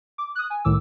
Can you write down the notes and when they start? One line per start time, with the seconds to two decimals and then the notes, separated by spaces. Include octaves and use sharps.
0.18 D6
0.35 D#6 F#6
0.50 G#5
0.65 C2 A2 D#3 D6 E6